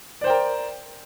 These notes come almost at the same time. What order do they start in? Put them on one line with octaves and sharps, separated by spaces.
D5 C5 G5 A#4